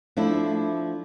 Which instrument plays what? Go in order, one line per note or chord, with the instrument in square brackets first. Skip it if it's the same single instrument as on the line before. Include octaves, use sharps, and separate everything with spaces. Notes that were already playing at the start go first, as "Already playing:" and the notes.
[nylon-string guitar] F3 A3 D4 E4